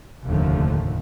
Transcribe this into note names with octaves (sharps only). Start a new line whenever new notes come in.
F1 D#2 A2 D3 F3 A3